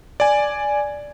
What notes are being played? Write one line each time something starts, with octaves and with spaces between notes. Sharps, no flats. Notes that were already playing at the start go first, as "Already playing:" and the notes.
D5 G#5